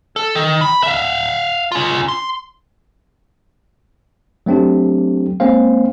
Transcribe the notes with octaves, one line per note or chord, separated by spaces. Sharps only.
A4
D#3
B5
E5 F5
C#4 F4
C6
F#3 A3 C4 D4 G4
G#3 A#3 C4 C#4 C5 F5